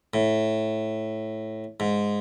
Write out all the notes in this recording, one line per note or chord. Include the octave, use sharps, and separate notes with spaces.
A2
G#2